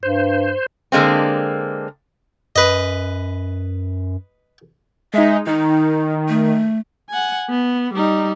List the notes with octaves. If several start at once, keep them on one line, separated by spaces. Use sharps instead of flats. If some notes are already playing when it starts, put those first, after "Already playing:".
G2 C5
D3 G#3 A#3 C4
F#2 B4 D#5
G#3 D#4 E5
D#3 D#4
A3
F#5 G#5
B3
G3 D#4